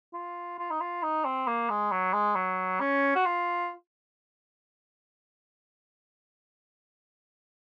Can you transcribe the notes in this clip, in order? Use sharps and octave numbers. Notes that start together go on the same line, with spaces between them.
F4
F4
D#4
F4
D#4
C4
A#3
G#3
F#3
G#3
F#3
C#4
F#4
F4